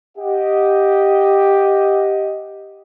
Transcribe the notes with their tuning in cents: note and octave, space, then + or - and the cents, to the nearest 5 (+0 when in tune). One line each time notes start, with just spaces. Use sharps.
G4 +0 D#5 +5 F#5 -10